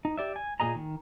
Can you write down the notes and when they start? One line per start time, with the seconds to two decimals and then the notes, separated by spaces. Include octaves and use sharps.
0.05 D#4
0.17 G4 D5 E5
0.36 G#5
0.60 A#2 C#3 G#4 D#5 A#5
0.75 D#3